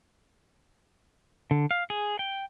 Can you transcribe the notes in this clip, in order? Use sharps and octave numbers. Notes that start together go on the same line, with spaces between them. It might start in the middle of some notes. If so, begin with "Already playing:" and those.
D3
F5
G#4
G5